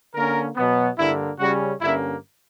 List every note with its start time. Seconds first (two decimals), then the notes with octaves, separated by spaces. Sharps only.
0.14 D3 A#3 C#4 A#4
0.56 B2 F#3 B3
0.98 G2 D3 A#3 E4
1.39 C#3 G3 C#4 F#4
1.81 G2 D3 A#3 C#4 E4